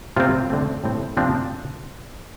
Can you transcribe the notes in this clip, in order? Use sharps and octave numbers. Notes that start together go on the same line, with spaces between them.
C3 G3 C4 F4
D3 A3 C4
A2 G3 C4
C3 F3 C4 D4